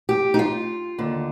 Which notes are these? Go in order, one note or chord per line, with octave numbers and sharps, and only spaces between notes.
G4
D#4
F4
D#2 D3